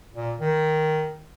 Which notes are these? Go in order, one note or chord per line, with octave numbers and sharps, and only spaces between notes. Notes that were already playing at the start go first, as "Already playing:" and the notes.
A#2
D#3